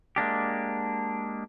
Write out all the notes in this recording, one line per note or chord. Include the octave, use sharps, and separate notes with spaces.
G#3 A#3 D4 G4